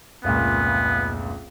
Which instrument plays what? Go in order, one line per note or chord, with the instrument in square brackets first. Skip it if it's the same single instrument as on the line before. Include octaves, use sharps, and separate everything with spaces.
[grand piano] F1 C#2 A#2 [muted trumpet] B3